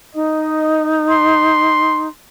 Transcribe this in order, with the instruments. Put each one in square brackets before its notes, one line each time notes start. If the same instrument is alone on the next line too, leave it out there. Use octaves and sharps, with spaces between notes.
[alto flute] D#4 [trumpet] D#5
[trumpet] C6